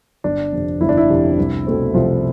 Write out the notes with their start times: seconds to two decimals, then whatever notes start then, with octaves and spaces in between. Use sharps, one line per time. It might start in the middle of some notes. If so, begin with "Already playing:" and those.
0.24 G1 D4
0.53 F2 C3
0.81 G1 E4
0.89 D4
0.97 E4
1.10 F2 C3
1.38 C2
1.66 B2 A3 C4
1.94 C2 F3 F4